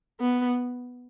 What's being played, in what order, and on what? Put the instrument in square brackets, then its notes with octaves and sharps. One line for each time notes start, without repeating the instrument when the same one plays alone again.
[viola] B3